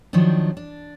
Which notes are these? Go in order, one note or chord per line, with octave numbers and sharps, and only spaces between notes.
D#3 F3 F#3 C4 D4
D4